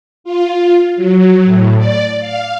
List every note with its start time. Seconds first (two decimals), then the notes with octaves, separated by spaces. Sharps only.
0.24 F4
0.96 F#3
1.44 A2
1.78 D5
2.20 F5